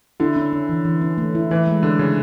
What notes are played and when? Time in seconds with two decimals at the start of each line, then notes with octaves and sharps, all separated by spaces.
0.20 D3 E4
0.36 C#4
0.53 C#4
0.69 E3
0.85 E3
1.02 C#4
1.18 A3
1.35 E4
1.51 E3 E4
1.67 G#3
1.83 D3 C#4
1.99 C#3 C#4